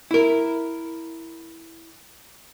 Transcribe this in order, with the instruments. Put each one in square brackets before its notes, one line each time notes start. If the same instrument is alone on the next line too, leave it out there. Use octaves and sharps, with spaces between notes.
[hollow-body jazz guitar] E4 A#4